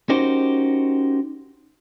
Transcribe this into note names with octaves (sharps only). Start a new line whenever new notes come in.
C#4 D#4 F#4 G4 A#4 C5